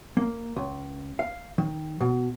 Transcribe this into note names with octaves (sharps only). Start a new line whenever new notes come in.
A#3
C#2
F5
D#3
B2